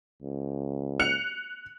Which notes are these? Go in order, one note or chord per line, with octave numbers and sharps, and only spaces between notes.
C#2
F#6 C#7 F7